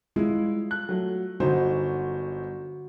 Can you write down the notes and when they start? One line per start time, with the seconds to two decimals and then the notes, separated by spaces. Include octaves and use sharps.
0.16 G3 G#3 E4 F4
0.71 F#6
0.89 F#3 A3
1.40 G1 D3 D#4 F#4 C5